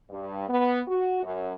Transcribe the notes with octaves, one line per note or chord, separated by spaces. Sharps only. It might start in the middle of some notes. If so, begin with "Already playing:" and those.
G2
B3
F#4
F#2